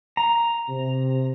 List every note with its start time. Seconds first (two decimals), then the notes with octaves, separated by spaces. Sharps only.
0.17 A#5
0.69 C3